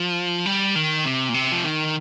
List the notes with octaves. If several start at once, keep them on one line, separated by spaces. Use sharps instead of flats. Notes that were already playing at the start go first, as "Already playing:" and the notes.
Already playing: F3
G3
D#3
C3
A#2
C3
F3
D#3